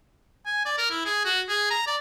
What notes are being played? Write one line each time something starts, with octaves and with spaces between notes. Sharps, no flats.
G#5
D5
A#4
E4
G#4
F#4
G#4
A#5
D5